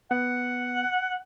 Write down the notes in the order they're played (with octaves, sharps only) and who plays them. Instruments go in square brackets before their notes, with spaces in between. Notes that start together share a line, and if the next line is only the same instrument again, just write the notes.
[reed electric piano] B3 [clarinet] F#5